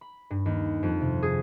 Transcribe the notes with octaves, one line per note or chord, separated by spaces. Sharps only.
B5
G2
D#2
F2
C3
G#4